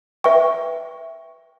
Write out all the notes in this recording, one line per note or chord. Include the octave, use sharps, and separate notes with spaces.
B4 E5 G5 C#6